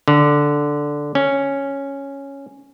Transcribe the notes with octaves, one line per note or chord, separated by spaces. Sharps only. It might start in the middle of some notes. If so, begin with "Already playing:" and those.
D3
C#4